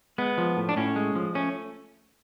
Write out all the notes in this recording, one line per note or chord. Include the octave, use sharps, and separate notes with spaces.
G#3 B3
F3
A2
D4
A2 C#4
G#3
F3
A3 C#4